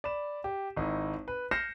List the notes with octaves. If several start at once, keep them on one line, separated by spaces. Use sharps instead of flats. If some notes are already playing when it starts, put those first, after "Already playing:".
D5 B5 E7
G4
G#1 D#4 E4
B4
F6 G6 A#6 C7 C#7 E7